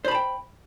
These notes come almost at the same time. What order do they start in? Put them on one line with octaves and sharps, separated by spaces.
C5 B5 A5 G5